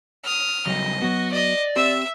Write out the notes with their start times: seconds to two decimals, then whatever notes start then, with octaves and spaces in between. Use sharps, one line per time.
0.24 D#6 F6
0.67 C#3 F#3 G3 D#5
1.02 F#3 B3 F#4
1.32 D5 D#5
1.76 C4 G4 C5 E5 E6